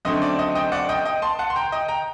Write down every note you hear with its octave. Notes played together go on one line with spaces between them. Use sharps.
F#2 D3 A3 C4 D#5
D5
D#5
D#5 G5
D5 F#5
D#5 G5
D#5 G5
A5 C6
F#5 A5
C6
G5 A#5
D#5 G5
G5 A#5